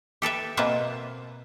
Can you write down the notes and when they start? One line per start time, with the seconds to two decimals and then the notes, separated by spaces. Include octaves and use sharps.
0.22 G4 A4 B4 E5
0.57 B2 A#3 C4 B4 E5